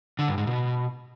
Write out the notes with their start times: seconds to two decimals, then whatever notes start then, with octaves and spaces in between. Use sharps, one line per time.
0.19 D3
0.28 G2
0.38 G#2
0.47 B2